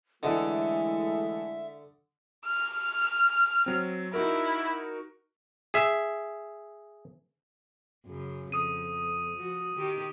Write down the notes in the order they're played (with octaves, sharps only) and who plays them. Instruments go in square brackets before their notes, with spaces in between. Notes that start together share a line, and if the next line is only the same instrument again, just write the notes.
[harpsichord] D3 [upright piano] E3 A4 D#5 [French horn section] G#3 A3 E4 [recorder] E5
[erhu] F6
[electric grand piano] F#3 C4
[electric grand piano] D#4 F#4 A#4 [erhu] E4
[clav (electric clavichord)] G#4 E5
[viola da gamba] F#2 C#3
[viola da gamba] F2 [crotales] D#6 D#7
[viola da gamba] F3 F#4
D#3 G4